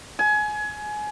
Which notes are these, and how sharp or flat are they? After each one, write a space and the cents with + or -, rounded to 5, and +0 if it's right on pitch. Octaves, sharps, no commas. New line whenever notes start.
G#5 +25